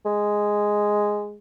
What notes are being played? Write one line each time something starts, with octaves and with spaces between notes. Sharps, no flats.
G#3